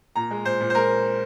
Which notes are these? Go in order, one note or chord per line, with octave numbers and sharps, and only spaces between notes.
A#2 A#5
G#3
A#2 C5
A#2
C5
G#3 A#4